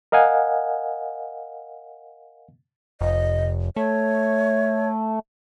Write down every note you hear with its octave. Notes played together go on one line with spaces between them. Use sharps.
A#4 D#5 F5 F#5 G#5
F1 D#5
A3 C#5